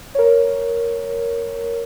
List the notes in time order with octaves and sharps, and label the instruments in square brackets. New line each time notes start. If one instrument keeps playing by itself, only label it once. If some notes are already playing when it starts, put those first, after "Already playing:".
[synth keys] A#4 C#5